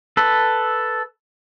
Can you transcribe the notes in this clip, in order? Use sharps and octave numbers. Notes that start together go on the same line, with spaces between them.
A4 B4